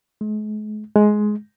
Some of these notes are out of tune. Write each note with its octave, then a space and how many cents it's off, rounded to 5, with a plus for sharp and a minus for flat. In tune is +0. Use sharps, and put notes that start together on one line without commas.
G#3 +45
G#3 +15